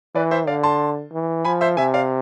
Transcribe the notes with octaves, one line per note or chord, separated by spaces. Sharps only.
E3 B4 D5
C5 E5
D3 D5 F5
A5 C6
E3
F3 G#5 B5
C5 E5
C3 E5 G#5
D5 F5